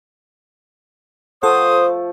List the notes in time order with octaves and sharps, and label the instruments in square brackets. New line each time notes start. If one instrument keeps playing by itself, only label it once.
[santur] F3 A3 [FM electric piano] A4 F#5 [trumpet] C5 [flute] D#6